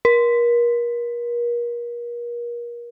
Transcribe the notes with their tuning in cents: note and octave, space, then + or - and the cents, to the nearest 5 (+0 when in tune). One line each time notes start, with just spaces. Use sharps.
A#4 +35